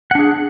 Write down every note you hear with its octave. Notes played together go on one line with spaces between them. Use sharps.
D4 G#4 F#5